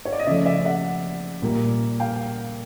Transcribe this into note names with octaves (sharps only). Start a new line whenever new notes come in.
C#5
D5
D#5
C#3 F3 A3 D5 E5
D5 E5
E5 F#5
A#2 G3 A#3
F5 G5